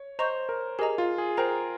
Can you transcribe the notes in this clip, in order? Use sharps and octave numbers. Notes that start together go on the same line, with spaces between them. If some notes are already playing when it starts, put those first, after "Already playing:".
Already playing: C#5
C5 D#5 A#5 C#6 G6
A#4
G4 G#4 A#4 D#5 A#5
F4
G#4
G#4 A#4 C5 G5 A#5